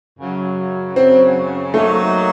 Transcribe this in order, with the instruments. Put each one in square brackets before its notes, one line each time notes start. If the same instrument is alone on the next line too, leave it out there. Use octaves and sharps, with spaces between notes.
[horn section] F#2 C#3 F#3
[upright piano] C4
[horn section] F#3 A#3 D#4 F#4 [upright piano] A3